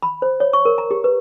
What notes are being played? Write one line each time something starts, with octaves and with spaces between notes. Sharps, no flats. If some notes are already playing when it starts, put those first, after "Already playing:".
B5
C5
C#5
C#6
A#4
A#5
G4
B4